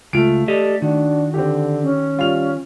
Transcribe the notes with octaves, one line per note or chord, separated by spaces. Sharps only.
C#2 G#3 A3 F4 D7
G4 A4 D5 D#5
D#3 D4 F#4
D3 C4 G4
C#4
G3 F4 F7